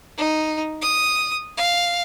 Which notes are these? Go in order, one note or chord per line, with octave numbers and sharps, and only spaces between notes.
D#4
D#6
F5